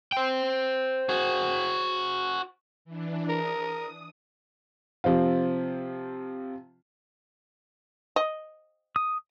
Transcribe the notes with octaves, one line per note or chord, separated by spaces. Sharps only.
C5 G5
F#4 G#4
E3 D4
A#4 D#6
C3 F3 C4 F4
D#5
D#6